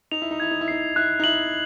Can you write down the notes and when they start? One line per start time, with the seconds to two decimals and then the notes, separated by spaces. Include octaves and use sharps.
0.11 D#4 F7
0.22 E4
0.31 D#4
0.40 E4 G#6
0.51 D#4
0.61 E4
0.68 D#4 C7
0.96 E4 F#6
1.20 D#4
1.24 E4 F#7